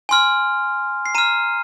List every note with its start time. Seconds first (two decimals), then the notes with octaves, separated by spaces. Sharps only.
0.09 G#5 C6 F6
1.06 C7
1.15 A#5 F6 D#7